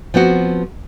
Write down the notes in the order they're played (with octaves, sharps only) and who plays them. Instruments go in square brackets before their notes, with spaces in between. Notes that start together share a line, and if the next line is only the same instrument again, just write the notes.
[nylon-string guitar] F3 B3 C4 F#4